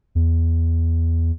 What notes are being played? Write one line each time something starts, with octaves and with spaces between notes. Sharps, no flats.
E2